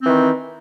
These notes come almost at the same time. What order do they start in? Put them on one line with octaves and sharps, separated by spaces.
C4 E3 D#3